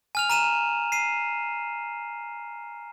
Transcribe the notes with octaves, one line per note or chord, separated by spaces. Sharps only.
G#5 F6 F7
A#5 D#7 E7
C7 D#7